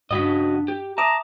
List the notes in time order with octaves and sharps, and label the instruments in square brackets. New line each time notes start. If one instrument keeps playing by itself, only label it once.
[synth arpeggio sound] G2 B6 [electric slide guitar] C#3 F#4 D#5 [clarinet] D4
[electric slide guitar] G4
[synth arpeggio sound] E5 D6 D#6 [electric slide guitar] A5 [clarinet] A#5